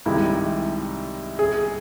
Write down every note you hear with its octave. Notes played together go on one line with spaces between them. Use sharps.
C2 C3 D#3 G#3 E4
G#4